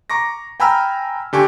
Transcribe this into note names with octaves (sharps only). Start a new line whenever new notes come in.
A#5 C#6 D6 A#6
G5 G#5 A#5 B5 E6 F6
D3 G4 G#5 C#6